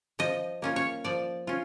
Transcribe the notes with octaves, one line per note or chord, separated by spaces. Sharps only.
F3 D#5
A#3 C#4 F4
C#5
F3 D5
C#4 F4